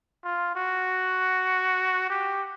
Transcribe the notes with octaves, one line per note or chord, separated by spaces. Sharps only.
F4
F#4
G4